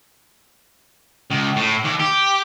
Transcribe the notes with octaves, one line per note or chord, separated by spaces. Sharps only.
C#2
A2
D#2
G4